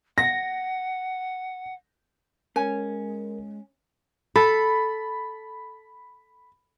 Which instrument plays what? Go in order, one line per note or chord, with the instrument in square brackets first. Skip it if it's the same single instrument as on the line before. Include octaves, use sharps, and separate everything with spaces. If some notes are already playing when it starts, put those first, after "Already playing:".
[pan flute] F#5 [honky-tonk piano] A#6
[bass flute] G#3 [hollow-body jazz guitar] C#4 [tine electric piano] A#4 [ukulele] G#5
[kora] A4 [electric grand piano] B5